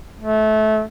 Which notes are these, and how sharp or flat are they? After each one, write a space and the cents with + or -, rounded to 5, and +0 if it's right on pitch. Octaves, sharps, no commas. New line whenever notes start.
A3 -25